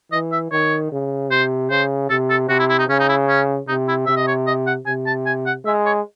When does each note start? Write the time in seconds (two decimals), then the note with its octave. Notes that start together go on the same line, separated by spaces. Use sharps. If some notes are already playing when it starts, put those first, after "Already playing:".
0.12 E3 D#5
0.32 E5
0.52 D#3 C#5
0.92 C#3
1.31 C3 C5
1.70 C#3 C5
2.10 C3 A4
2.30 A4
2.49 C3 F#4
2.59 E4
2.70 E4
2.79 D#4
2.88 C#3 C#4
3.00 D#4
3.09 E4
3.29 C#4
3.68 C3 D#4
3.88 E4
4.06 C3 E5
4.17 D#5
4.27 C#5
4.47 D#5
4.67 F#5
4.86 C3 G#5
5.06 A5
5.26 G#5
5.46 F#5
5.65 G#3 E5
5.86 C#5